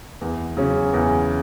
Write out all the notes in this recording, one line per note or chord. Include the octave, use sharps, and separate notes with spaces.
E2
C#3 F#3 C#4
E2